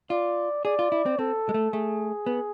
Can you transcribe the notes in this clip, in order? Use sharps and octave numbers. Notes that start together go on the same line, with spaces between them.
F4 D5
G#4 D5
F4
E4
C4
C4 A4
G#3
A3
A3 G#4
B3